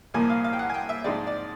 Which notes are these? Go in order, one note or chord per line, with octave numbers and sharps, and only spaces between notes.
C2 A#2 F3 A#3 G#5
F5
F5
G5
F#5
G#5
G5
E5
G#2 F3 G#3 C4 D5
D5